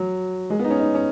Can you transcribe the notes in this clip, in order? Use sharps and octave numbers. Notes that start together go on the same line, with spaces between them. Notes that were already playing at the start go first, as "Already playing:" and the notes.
Already playing: F#3
G#3
B3
D#4
C#4
D#4
C#4